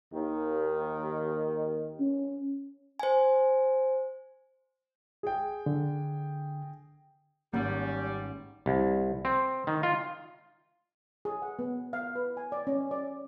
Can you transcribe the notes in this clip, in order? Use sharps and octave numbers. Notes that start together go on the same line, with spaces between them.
D#2 D#3
C#4
C5 G#5
G#4 G5
D3
G#1 G3 A#3 C#4 F#5
C2
C4
D#3
F4
G#4
F#5
B3
F5
B4
G#5
D5
C#4
D5